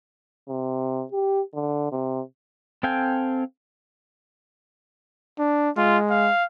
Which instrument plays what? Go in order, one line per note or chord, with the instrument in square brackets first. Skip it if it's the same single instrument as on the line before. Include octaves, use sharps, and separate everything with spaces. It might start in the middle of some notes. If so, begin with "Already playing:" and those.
[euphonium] C3
G4
D3
C3
[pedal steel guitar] C4 A4 F5 G5 G#5
[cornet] D4
[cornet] G#3 [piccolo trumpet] F4
[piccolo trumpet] F5